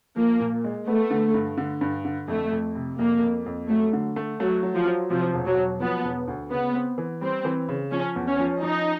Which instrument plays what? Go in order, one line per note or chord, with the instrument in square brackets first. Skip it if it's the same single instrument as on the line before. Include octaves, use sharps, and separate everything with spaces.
[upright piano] F3 [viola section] A#3
[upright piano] A#2
G#3
[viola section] A3 [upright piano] B3
[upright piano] D3
G2
D3
G2
D3
[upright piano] F2 [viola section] A3
[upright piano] F2
C3
[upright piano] F2 [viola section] A#3
[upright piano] F2
F2
[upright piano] F#3 [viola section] A3
[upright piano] D3
A3
[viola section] F#3 [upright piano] A3
[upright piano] F#3
[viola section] F3
[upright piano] F#3
[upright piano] C3 [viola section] F3
[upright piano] E1
[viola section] F#3
[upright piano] E1
[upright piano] F3 [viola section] B3
[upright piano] E1
D2
[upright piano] C#3 [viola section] B3
[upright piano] C4
E3
[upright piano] G3 [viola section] C4
[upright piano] E3
C#3
[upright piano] F3 [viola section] C#4
[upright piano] E2
[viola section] C#4
[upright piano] F3
[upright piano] F3 [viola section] D#4